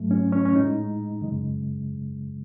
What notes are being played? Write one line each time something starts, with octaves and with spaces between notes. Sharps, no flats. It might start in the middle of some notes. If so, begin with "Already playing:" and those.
Already playing: G#2 F#3 A3
C#4
C#4
C#4
A2 G#3 D#4
F#2 C#3 G#3